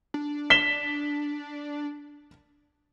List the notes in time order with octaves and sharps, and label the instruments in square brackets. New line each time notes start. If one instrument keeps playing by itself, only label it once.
[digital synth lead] D4
[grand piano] B6 E7 G7